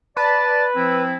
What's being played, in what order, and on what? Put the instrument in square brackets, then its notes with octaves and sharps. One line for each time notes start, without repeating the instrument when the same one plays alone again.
[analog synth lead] B4 [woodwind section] D5 A5
[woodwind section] F3 C4 E4